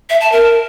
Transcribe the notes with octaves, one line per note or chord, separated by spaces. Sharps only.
E5
A5
A#4